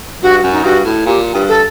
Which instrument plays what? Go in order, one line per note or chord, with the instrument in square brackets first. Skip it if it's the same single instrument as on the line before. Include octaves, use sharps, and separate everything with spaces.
[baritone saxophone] G2 [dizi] F#4
[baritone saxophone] F#2
[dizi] D#4
[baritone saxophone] G2 [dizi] F#4
[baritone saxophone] A2
[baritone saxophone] A#2 [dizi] G4
[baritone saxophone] G2
[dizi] A4